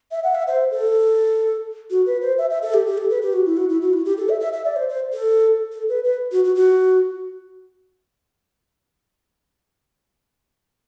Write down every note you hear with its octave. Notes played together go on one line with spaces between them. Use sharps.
E5
F#5
E5
C5
A4
F#4
B4
C5
E5
E5
A4
G4
G4
A4
B4
G4
F#4
E4
F#4
E4
F#4
E4
G4
A4
E5
E5
E5
D5
C5
C5
A4
A4
B4
B4
F#4
F#4
F#4